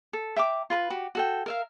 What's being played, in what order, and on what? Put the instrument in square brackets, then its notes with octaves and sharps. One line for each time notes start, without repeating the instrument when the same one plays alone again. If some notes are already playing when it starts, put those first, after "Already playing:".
[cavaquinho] A4
E5 G5 A#5 D6
F4 B4 A#5 B5
F#4 G4
F#4 A4 G5
A#4 E5 F5